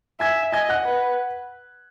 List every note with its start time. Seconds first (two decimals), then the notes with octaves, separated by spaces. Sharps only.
0.20 E5 G#5 G#6
0.52 D#5 G#5 G#6
0.69 F#5 F#6
0.85 B4